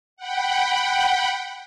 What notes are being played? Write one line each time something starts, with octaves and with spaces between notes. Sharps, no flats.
F#5 G5 B5